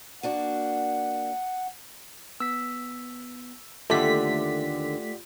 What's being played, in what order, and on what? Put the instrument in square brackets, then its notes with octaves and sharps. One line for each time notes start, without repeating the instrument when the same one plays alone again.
[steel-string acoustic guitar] A#3 D4 F#4 [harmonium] F#5
[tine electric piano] B3 [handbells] E6 B6
[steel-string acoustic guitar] D#2 D3 [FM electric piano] A3 B6 [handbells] F4 [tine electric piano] G4 D5 F#5